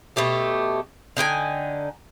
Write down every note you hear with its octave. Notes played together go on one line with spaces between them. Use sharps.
B2 A3 G4 A4
D3 D#4 G5 G#5